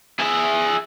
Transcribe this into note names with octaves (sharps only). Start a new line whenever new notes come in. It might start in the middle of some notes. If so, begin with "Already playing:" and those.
G#4 E5